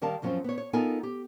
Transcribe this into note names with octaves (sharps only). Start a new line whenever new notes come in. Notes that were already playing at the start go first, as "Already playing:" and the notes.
D#3 G3 A#4 F5 A5
F#2 F3 F#3 A#3 C4 C#4
B3 C#5
C#5
B3 D#4 F4 A4 A#4 G#5
G4